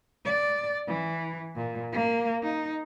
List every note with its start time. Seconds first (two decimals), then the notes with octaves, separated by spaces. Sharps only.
0.25 D5
0.87 E3
1.56 A#2
1.92 A#3
2.42 D#4